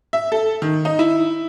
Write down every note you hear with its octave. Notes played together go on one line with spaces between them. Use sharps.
E5
A4
D#3
D#4
E4